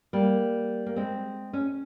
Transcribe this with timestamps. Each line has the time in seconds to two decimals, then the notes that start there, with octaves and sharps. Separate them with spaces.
0.13 G3 A#3
0.86 A#3
0.96 G#3 C4
1.53 C#4